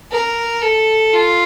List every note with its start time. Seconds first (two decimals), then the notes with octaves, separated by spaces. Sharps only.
0.11 A#4
0.62 A4
1.13 F4